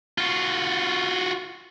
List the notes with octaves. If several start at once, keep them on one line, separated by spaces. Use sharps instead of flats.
F4 F#4